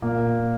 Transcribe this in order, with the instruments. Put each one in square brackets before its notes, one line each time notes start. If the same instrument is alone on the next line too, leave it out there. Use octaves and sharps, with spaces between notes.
[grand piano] A#2 A#3